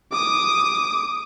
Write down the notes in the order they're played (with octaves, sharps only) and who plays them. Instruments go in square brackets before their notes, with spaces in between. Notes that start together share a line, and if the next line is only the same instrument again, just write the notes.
[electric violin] D6 D#6